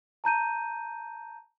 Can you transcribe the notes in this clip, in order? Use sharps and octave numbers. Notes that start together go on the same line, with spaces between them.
A5 A#5 G6 D#7